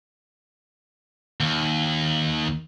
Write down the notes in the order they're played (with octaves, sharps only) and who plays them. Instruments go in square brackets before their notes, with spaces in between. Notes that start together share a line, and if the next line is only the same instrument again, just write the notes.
[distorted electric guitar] D#2